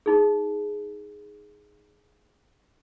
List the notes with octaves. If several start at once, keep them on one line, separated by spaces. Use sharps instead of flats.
D#4 G#4